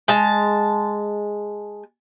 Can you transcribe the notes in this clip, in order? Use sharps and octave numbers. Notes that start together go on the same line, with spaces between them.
G#3 A5